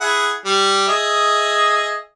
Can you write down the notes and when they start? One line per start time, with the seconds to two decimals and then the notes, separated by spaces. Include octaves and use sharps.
0.01 E4 G#4 F#5
0.45 G3
0.88 G#4 D#5 E5